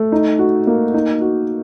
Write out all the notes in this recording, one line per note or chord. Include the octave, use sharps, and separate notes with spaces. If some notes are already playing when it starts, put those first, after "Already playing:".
Already playing: A3
D#4
F#4
A#3
D#4
F#4